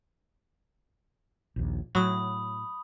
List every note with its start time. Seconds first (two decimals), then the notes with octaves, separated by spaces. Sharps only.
1.56 A#1 D#2
1.95 A2 F#3 B5 D#6